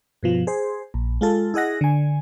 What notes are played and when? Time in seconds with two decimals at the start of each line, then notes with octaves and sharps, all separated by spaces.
0.23 G2 B2 F3
0.47 G#4 C5
0.94 A#1
1.21 G#3 F4 A4
1.54 E4 G#4 D#5 F#5 A#6
1.81 D3 G#5